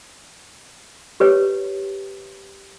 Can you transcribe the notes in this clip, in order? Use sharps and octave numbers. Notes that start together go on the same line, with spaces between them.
G4 B4 C#5